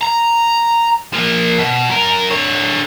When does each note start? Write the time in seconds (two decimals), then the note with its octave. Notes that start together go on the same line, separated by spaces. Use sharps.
0.03 A#5
1.13 F3 A#3
1.58 B2
1.89 F#3 A#4
2.31 D3 C#5